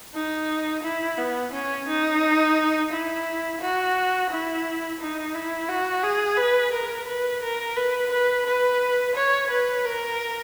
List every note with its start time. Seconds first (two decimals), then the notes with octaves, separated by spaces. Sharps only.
0.14 D#4
0.83 E4
1.18 B3
1.53 C#4
1.88 D#4
2.92 E4
3.61 F#4
4.30 E4
5.00 D#4
5.34 E4
5.69 F#4
6.03 G#4
6.38 B4
6.73 A#4
7.08 B4
7.43 A#4
7.76 B4
8.12 B4
8.46 B4
9.15 C#5
9.51 B4
9.85 A#4